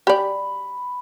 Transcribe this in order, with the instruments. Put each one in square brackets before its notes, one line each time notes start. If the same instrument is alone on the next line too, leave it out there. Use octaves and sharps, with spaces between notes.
[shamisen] G4 D5 [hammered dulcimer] B5